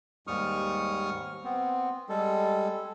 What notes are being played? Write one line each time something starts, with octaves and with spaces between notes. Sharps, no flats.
D#2 G#2 G3 C#6 D#6 F6
B3 C4
G3 G#3 A4